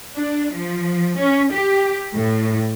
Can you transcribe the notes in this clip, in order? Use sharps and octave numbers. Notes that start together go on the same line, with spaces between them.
D4
F3
C#4
G4
A2